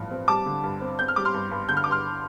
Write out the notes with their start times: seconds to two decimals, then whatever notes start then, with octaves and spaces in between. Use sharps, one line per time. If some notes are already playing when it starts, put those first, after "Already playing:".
Already playing: A1 G2 F3
0.11 C4
0.28 G3 A5 D6
0.46 D3
0.64 G2
0.81 C4
0.99 C4 G6
1.08 F6
1.16 G3 D6
1.25 C6 F6
1.34 G2
1.51 G2
1.69 D3 G6
1.77 F6
1.84 D6
1.87 G2 C6 F6